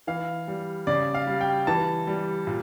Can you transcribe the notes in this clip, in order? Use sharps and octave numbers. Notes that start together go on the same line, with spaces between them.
E3 F5
G3
C#3 D5
F5
G3
G5
E3 A5
G3
A#2